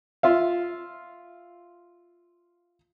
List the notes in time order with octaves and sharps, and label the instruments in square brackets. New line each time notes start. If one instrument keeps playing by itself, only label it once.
[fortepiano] F4 E5 F5